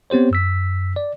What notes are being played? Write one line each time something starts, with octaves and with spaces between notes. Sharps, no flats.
B3 C4 G4 C5 C#5
F#2 E6 B6
D5